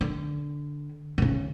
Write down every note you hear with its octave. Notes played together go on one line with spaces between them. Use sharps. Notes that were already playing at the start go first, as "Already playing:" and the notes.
D3
B2
C#3